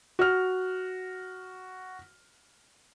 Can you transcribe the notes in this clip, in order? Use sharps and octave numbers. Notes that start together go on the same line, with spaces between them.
F#4 F6